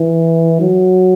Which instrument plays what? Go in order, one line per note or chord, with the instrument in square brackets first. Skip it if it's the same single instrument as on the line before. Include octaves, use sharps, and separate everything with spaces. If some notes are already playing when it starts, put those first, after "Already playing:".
Already playing: [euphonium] E3
F#3